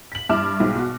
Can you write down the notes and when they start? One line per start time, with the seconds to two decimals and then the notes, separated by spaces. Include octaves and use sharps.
0.12 B6 F#7
0.29 G2 E4 D6 F6 E7
0.60 B1 G#2
0.75 B2 F#4